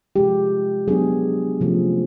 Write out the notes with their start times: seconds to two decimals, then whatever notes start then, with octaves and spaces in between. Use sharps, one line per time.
0.16 C3 F3 G#3 G4
0.88 F#3 B3 D4 G#4
1.61 C3 F3 A3 C#4